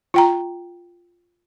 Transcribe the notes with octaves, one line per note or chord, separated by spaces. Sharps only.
F4 G5 A#5